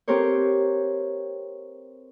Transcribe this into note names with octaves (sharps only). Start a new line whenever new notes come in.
C4 G4 A4 A#4 C5 C#5